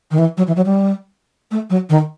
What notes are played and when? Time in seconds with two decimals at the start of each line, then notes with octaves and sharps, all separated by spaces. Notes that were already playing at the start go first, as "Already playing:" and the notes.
0.11 D#3
0.18 E3
0.37 F#3
0.47 E3
0.56 F#3
0.66 G3
1.51 A3
1.70 F#3
1.90 D#3